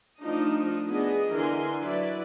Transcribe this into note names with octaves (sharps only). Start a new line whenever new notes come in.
F3 A3 D4 D#4 F4 D#5
B3 D4 G#4 D#5
D3 E3 A#4 G#5 C6
F#3 E4 B4 D5